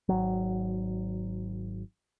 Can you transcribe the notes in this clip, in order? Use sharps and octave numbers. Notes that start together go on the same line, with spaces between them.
G#1 F#3